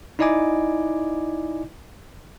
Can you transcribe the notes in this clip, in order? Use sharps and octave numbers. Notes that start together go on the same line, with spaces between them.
D#4 E4 D5 D#5 G#5 D6